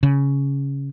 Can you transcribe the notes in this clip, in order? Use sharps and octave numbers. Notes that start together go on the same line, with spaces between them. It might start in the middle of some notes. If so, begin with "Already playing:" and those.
C#3